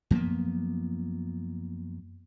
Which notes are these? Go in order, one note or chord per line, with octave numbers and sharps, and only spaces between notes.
F#2 F3 A#3 B3